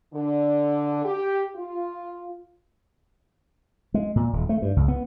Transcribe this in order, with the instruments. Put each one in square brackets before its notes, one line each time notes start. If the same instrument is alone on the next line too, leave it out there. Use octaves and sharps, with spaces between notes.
[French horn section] D3
G4
F4
[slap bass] G#3
A#2
D#1
A3
G2
C#2
B3